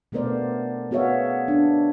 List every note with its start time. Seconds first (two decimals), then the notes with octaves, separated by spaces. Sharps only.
0.12 B2 A3 B3 A#4 C5 D5
0.91 B3 F#4 G#4 C#5 E5 F5
1.48 D4